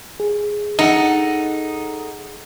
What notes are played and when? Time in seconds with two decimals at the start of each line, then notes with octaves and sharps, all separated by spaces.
0.20 G#4
0.79 D#4 A4 F#5